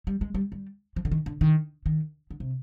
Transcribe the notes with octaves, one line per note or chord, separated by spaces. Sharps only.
G3
G#3
G3
G3
F3
D3
D#3
D3
D#3
D#3
D3
C3